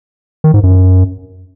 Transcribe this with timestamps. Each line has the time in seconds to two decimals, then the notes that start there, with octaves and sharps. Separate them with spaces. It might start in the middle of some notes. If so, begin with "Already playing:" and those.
0.44 D#3
0.54 G#2
0.63 F#2